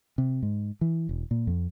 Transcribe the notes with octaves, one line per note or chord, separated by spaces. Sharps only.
C3
G#2
E3
E1
A#2
F2